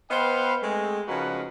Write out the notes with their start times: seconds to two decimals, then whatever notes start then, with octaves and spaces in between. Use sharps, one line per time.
0.11 B3 B4 C5 D#5 F5 G5
0.62 G#3 A3 C4
1.08 C#3 F3 D#4 F#4 A#4 B4